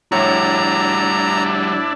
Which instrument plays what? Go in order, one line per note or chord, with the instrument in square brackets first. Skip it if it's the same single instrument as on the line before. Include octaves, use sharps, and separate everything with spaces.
[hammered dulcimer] A2 [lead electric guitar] G3 F#4 [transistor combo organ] D4 E4 [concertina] A#5